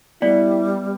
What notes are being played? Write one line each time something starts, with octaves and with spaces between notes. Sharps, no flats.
G3 B3 E4 D5